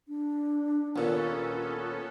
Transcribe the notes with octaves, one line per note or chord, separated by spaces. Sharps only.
D4
D#2 A#2 B3 C#4 F4 A4